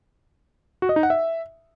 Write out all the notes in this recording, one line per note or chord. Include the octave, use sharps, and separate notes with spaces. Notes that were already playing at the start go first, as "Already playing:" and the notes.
F#4
D#5
D#4
F#5
E5